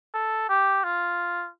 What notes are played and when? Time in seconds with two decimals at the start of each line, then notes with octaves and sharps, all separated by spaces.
0.14 A4
0.49 G4
0.84 F4